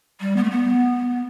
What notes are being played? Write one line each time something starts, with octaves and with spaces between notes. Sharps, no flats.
G3
B3
A3
B3